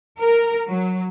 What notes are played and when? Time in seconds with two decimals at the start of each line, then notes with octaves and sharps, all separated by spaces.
0.19 A#4
0.67 F#3